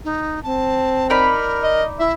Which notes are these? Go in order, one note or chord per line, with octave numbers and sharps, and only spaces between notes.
D#4
C4 A5
D#4 A#4 D5 B5
D#5
E4 E5